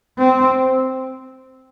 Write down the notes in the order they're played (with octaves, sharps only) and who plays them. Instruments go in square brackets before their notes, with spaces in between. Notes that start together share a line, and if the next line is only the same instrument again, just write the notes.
[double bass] C4